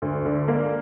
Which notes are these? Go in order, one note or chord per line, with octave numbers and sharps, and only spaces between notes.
D2
D3
A#3